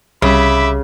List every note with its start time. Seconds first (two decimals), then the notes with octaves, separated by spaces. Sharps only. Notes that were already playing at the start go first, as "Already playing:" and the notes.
0.22 C2 C#3 G3 E5 B5 D6